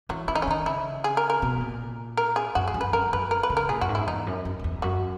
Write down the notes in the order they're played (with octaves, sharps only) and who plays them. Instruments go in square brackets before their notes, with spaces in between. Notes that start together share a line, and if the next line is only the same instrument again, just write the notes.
[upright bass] E3 [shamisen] F#3
[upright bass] E3 [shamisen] E4
[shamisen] D#4
C#4
[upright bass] D#3 [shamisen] D#4
[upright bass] C#3 [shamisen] E4
[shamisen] G#4
A#4
A#4
[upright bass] B2
A#2
[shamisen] A#4
G#4
[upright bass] F#2 [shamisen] F#4
[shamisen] G#4
[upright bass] F#2
[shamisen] B4
[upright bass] F#2 [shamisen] A#4
[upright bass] F#2 [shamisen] B4
[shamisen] A#4
B4
[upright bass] C#3
[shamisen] A#4
[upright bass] A#2 [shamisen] G#4
[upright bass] F#2 [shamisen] F#4
[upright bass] G#2
[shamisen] E4
[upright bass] E2 [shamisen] D#4
[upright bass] F#2
F#2
F#2
E2
[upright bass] F#2 [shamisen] F#4